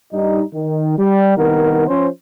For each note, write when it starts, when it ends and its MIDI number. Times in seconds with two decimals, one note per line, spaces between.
0.13 0.43 43
0.13 0.43 55
0.13 0.43 63
0.54 0.95 51
0.98 1.36 55
1.37 1.85 36
1.37 1.85 51
1.37 1.85 59
1.37 1.85 70
1.88 2.07 53
1.88 2.07 61
1.88 2.07 72